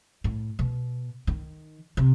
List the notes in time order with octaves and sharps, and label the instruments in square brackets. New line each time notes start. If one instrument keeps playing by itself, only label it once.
[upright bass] A2
B2
D#3
C3